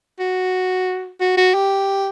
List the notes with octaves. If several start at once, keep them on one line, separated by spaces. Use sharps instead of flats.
F#4
F#4
F#4
G4